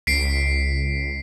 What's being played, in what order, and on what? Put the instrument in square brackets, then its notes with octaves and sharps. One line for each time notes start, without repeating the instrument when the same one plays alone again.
[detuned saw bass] C#2 [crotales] B6 C7 D7